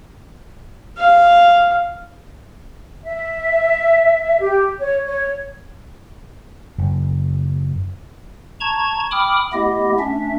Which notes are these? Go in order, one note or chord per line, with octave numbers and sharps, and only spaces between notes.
F5
E5
G4
C#5
C#5
F#1
A5 A#5 C#6 G#6
G5 B5 D6 D#6 F6
A3 B3 E4 G4 D#5
A3 C#4 D4 E5